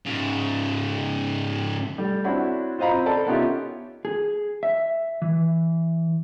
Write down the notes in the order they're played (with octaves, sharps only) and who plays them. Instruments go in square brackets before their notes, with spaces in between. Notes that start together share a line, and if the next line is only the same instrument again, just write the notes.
[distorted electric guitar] G#2 C#3
[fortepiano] G3 A3
C4 D4 E4 F#4 C#5 B5
F4 C5 D#5 F5 A#5 B5
C4
A4 A#4 C5 D5 A5 B5
B3 C#4 D#4 F4 G4 E5
[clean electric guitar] G#4
E5
E3